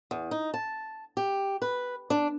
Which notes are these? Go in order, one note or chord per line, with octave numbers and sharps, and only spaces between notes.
E2
D#4
A5
G4
B4
D4